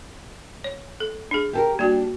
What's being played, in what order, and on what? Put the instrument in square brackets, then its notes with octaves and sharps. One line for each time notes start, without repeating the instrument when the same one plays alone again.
[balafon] C#5
A4
D4 G#4
[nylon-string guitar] G4 A4 A#4
[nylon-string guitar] G3 D4 [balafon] A#3 F#4